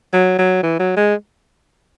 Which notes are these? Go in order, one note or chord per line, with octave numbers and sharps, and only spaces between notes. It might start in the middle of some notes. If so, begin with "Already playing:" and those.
F#3
F#3
E3
F#3
G#3